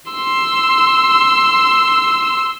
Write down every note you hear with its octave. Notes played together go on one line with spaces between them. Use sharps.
C6 E6